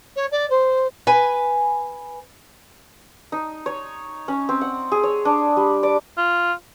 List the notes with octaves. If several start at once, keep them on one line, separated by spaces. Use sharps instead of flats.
C#5
D5
C5
B4 G#5
D#4
C#5
C#4
C4
F#5
G#4
C#5
D4
G3
D5
F4